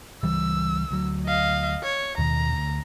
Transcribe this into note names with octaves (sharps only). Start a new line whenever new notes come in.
C#2 E3 G3 E6
D2 F#3
D#5 F5
C#5
D#2 B2 D#3 A#5
D2